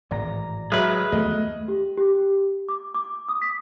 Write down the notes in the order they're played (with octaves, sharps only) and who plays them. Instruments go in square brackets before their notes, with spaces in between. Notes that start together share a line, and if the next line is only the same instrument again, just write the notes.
[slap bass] G#1 A2 E3 [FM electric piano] D5 A#5 A#6
[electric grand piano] F#3 E5 F6 [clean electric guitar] G#3 B4
[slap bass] D#2 F#3 B3 [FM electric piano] A3 [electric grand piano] D#5
[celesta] G4
G4
D6
D6
D#6
B6